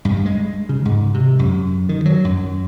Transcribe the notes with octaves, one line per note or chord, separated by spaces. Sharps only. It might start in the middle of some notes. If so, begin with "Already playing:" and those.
G2
G#3
C#3
G#2
C3
F#2
D#3
F#3
F#2